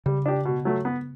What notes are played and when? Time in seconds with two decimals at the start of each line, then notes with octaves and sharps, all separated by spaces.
0.06 C#3 G3
0.26 D4 G4
0.45 B2
0.65 F#3 A3
0.85 B3